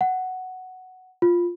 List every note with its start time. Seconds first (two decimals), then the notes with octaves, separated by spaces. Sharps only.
0.01 F#5
1.22 F4